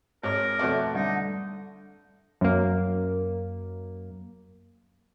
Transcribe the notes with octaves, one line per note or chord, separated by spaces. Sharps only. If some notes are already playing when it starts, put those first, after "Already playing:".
G#1 G#2 A#4 C#5 D6
F2 B2 A3 D5
D3 G3 D#4
F#2 A#3